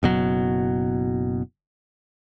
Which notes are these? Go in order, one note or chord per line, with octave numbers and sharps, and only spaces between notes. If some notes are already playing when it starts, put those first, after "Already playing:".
F#1 B2 F#3